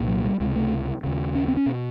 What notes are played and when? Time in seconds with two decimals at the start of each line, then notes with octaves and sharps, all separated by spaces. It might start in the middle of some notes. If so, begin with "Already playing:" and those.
Already playing: C2 A#2
0.08 F#3
0.24 G3
0.40 C#2 C3 G#3
0.56 A3
1.04 D#2 C#3
1.35 C#4
1.48 C4
1.57 C#4
1.66 B2